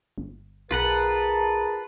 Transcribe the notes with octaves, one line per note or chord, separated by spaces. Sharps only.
G1
B1 F4 G#4 A#4 B4 F#5 A5